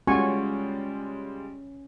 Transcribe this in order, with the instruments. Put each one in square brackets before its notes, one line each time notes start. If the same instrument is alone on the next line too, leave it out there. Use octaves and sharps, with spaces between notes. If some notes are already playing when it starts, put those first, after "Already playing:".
[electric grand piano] G3 G#3 F4 [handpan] C#4 [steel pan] F#4 G#5 C#6